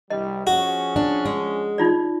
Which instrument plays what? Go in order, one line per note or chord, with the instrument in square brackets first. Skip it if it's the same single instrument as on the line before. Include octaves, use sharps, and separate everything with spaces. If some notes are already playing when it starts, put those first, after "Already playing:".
[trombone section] C2 G3 [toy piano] D#5
[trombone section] F3 C#4 G#4 [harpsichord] F#4
[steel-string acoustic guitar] D4
G#3
[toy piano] D#4 F4 D5